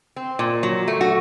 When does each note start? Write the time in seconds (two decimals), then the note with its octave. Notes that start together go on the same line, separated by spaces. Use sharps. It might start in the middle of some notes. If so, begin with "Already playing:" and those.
0.16 C4
0.39 A#2
0.63 F#3
0.88 A3
1.01 F#4